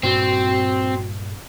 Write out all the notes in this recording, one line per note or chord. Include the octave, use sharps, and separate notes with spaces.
G2 A#2 C4 F#4